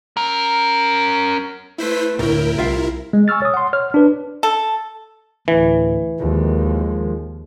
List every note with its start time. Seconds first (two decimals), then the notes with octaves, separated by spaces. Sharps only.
0.17 C#4 A#4
1.78 A3 E4 B4 C5 B6
2.19 D2 A2 E4 A#4 G5
2.58 C2 F4 E5 F5
3.13 G#3
3.28 G#5 C#6 E6 F6 A6
3.42 C#5 D#6
3.54 F#5 C6
3.73 C#5 F6
3.94 D4 B4
4.43 A4
5.48 D2 A2 E3
6.20 D#2 D#3 F3 G#3